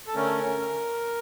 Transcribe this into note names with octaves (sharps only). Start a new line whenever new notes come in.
A4
D3 A3 C#4 A#4